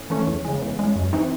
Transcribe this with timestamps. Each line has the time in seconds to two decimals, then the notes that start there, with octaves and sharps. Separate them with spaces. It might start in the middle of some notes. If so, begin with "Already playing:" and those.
Already playing: A2 A3 C#4
0.10 E3 A3 C#4
0.27 E2
0.45 C#3 G#3
0.62 E2
0.79 C#3 G#3
0.96 F#2
1.13 E3 C4 D#4